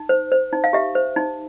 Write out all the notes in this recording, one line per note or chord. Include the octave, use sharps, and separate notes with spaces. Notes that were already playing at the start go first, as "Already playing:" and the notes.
Already playing: D#4
C5
C5
D#4
F5
G4 E5
C5
D#4